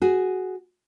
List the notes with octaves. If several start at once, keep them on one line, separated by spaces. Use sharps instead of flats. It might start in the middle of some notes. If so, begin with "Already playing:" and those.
F#4 G#4